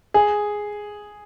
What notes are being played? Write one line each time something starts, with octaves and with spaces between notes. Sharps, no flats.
G#4